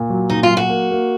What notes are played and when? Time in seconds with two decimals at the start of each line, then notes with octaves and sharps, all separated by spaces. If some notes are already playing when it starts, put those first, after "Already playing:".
Already playing: A#2
0.10 F#3
0.30 A#2 D#4
0.43 F4
0.50 F#3
0.57 F#4
0.70 A#3
0.91 A#3